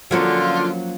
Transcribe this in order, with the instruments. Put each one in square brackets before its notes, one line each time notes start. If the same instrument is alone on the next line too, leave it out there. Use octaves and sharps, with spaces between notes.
[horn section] D3 [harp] F3 F6 [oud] F#3 A#3 C#4 [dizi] F4